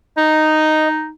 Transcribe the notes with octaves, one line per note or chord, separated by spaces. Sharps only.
D#4 D#5